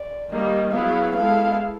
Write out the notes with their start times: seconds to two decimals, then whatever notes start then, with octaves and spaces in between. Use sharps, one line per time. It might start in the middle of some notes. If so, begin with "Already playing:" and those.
Already playing: D5
0.32 D#3 G3 A#3 D#5
0.74 F#3 B3 E4 G#4 F5
1.16 G#3 B3 E4 A4 F5